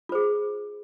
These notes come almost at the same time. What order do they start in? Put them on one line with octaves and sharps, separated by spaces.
F4 C5 G#4